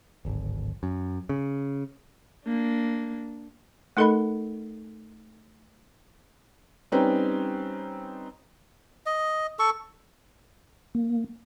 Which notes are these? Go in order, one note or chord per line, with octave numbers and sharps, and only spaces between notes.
D1 G#1
F#2
C#3
A#3 D4
A3 D#4 A4 A#4 D#5 B5
G3 C4 C#4 D#4 B4
D#5
A4 C#6
A#3